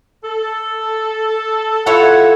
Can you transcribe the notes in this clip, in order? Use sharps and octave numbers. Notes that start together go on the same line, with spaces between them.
A4
E4 F4 A4 C#5 F#5